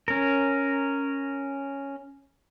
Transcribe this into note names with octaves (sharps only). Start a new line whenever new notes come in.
C#4 A#4